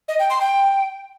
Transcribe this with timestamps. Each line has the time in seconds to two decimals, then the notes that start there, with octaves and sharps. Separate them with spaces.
0.08 D#5
0.19 G5
0.30 C6
0.41 G5